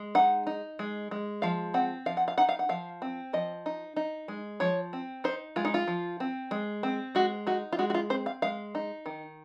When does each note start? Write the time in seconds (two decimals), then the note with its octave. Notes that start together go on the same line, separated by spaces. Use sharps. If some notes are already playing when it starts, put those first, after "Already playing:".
Already playing: G#3
0.15 D#4 F#5
0.47 D#4
0.79 G#3
1.11 G#3
1.42 F3 F5
1.74 C4 F#5
2.06 F3 F5
2.17 F#5
2.28 F5
2.38 D#4 F#5
2.49 F5
2.59 F#5
2.69 F3 F5
3.02 C4
3.33 F3 D#5
3.66 D#4
3.96 D#4
4.28 G#3
4.60 F3 C#5
4.93 C4
5.24 D#4 C5
5.56 G#3 F4
5.65 D#4
5.74 F4
5.88 F3
6.20 C4
6.51 G#3
6.83 C4
7.15 G#3 F#4
7.47 D#4 F#4
7.72 F4
7.79 G#3 F#4
7.90 F#4
7.94 F4
8.10 C4 C5
8.26 F5
8.42 G#3 F5
8.75 D#4
9.06 D#3